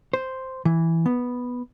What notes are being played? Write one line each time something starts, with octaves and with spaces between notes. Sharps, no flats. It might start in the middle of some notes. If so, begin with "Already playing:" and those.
C5
E3
B3